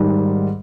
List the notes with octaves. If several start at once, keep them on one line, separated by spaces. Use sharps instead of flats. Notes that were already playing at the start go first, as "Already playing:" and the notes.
Already playing: G#2 D#3 G3